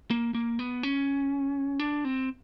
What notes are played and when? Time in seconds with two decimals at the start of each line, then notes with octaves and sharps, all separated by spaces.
0.11 A#3
0.35 A#3
0.59 B3
0.83 C#4
1.80 D4
2.05 C4